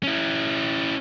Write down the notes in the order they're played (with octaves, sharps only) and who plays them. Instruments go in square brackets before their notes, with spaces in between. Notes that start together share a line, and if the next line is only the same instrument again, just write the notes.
[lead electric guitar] C#4 E4